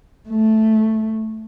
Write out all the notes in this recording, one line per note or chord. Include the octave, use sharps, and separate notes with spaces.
A3